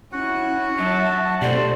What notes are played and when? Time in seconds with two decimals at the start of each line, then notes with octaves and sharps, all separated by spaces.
0.12 C#4 E4 F#4 F#5
0.78 F#3 E5 A5
1.42 B2 A3 G4 C5 D5